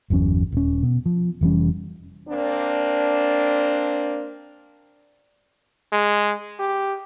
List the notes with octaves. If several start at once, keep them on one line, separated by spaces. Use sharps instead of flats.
G1 E2 F#3 C#4
D#1 C#4
B2
F3
F1 E3 G3 C#4
A#3 C4 D4
G#3
G4